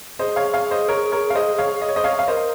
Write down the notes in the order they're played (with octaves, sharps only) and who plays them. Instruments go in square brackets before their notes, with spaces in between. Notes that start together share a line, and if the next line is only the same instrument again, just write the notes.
[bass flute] G#4 [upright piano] C5 D#5
[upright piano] C#5 F5
C#5 F5
C5 D#5
A#4 C#5
A#4 C#5
F5
C5 D#5
C#5 F5
D#5
C#5
C5 D#5
C#5 F5
F5
[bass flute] A#4 [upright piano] C5 D#5